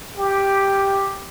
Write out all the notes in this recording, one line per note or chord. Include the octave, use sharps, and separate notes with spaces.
G4